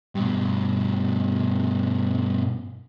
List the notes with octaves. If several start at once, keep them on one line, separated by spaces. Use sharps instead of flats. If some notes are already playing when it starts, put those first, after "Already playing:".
G2 B2